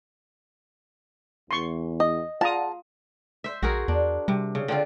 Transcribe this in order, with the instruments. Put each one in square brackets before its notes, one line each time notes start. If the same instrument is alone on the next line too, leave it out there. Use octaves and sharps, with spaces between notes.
[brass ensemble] E2 [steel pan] C6 C#6
[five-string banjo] D#5
[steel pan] F4 A#5 D#6 [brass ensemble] G#4 D5 F#5 [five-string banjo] A5
[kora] C5 E5
[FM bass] A#1 [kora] F#4 G#4 A#4
[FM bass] E2 [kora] D4
[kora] C3 [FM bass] G3
[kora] C#3
D3 C4 F4